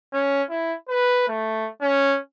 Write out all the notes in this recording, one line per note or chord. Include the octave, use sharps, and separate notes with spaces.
C#4
E4
B4
A3
C#4